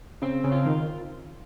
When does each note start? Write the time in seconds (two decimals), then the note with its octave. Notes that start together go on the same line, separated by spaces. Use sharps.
0.22 C#3 C4
0.44 C#3
0.52 F4
0.66 D#3